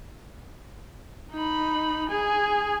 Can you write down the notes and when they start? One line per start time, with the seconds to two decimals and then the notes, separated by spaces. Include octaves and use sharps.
1.32 D#4 B5
2.09 G#4 G#5